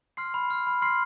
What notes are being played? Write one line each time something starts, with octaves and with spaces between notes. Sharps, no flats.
C6 F6 C7
B5
F6
B5
C6 F6 C7